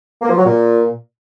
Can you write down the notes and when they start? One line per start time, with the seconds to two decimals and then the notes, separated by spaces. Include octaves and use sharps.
0.22 A#3
0.29 F3
0.37 F#3
0.45 A#2